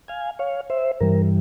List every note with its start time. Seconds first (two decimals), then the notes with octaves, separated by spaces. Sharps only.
0.08 F5 G#5
0.39 C#5 F5
0.70 C5 E5
1.00 G2 E3 G3 A#4